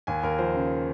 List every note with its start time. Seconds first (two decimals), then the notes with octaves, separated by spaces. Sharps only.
0.07 D#2 G#5
0.23 D#2 A#4
0.38 F3 C5
0.54 C#3